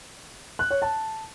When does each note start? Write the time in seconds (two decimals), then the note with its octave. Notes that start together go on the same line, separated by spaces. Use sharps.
0.59 F#6
0.70 C#5
0.82 A5